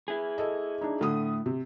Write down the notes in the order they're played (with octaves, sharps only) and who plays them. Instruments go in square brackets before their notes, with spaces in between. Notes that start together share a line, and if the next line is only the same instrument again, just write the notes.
[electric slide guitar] E4 G#4
[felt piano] A4 D#5
D4 D#4
[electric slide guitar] A2 [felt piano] D3 D#6
[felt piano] C3